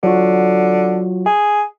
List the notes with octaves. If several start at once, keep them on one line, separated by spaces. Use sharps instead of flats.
D3 F#3 F4 F#4
G#4